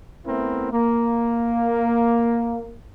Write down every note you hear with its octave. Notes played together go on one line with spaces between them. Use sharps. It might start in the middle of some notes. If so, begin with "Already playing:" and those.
A3 B3 C4 E4 A#4
A#3